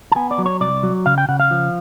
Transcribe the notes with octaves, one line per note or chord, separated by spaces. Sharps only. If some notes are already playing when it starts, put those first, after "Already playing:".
A5
B3 G#5
D5
F#3
C#5
C2 D5
F#3
C#3 F5
G5
C#3 F#5
F5
F3